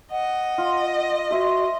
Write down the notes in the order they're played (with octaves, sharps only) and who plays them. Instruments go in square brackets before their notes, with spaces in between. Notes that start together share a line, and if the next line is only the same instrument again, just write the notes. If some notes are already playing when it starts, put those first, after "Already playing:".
[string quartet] D#5 [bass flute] F#5
[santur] F4
[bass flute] F#4 [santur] C5 E5